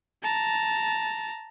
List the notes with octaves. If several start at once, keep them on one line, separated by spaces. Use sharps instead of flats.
A5 A#5